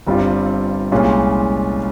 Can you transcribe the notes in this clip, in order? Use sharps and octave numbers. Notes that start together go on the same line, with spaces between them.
G1 G2 G3 C4 F4
C2 A#2 G#3 C#4 F4